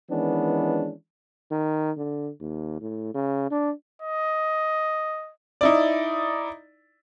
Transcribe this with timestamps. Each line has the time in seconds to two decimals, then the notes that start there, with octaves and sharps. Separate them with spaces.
0.11 D#3 E3 G#3 B3 C#4 D4
1.51 D#3
1.97 D3
2.41 D#2
2.81 A2
3.14 C#3
3.51 D4
4.02 D#5
5.61 D#4 E4 D5